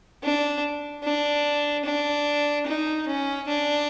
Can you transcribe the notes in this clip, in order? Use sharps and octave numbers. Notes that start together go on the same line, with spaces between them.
D4
D4
D4
D#4
C#4
D4